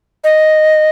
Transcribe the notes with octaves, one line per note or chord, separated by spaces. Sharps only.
D#5